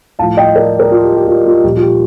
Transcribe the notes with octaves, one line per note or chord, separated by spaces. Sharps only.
A2 F3 F5 A5
D#5 G5
A#4 D5
A#4 D5
F4
G4
G4
F4
F4
A#2 F3 G4
F4
G4